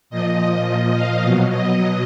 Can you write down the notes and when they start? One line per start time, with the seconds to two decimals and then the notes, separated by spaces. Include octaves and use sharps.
0.10 A#2 F3 D#5
0.94 F5
1.23 B2 F#3
1.51 D#5